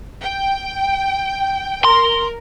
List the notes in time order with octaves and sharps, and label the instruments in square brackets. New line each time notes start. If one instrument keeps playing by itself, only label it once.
[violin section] G5
[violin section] A#4 [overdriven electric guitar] C6